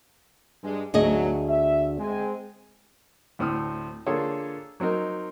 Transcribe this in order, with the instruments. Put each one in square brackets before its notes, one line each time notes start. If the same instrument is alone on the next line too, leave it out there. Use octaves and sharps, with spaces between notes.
[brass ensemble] G2 G#3
[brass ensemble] G#1 F#3 [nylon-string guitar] D2 G#4 D#5
[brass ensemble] E5
G#3 C4 G#5
[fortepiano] D2 A2 C4 D#6 F6
D3 A#3 F4 G#4 A4 C#5
F#3 C4 D#4 A#4